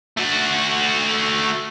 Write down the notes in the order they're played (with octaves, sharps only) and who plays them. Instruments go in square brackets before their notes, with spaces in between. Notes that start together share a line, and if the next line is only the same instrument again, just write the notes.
[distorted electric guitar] A3 F#4